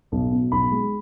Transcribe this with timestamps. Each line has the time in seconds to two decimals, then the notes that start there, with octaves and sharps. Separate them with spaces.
0.12 B1
0.32 B2
0.52 B1 B5
0.72 G#3